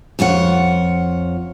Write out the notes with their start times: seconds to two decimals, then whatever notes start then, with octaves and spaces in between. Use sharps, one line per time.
0.19 F2 F4 C#5 F#5